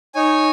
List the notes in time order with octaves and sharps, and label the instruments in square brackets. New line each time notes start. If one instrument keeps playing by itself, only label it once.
[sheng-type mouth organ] D#4 C#5 G#5